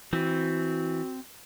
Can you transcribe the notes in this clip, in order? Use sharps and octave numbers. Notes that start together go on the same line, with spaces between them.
E3 C4 F#4